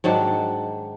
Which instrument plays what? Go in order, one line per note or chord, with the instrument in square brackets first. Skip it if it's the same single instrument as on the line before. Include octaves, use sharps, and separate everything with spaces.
[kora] G#2 D#3 F#3 D4